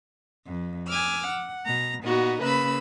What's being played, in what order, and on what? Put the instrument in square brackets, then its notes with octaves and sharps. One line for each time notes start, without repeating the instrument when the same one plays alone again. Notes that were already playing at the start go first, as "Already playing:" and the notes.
[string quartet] F2
G#5 D6 E6 F6
F#5
B2 A#5
A#2 B3 D#4 F#4
C#3 A#3 B4 B5 E6